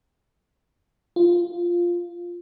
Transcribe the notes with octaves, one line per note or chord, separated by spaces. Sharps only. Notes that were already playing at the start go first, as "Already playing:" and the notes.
F4